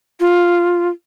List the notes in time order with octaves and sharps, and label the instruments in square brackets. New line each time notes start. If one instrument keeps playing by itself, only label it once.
[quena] F4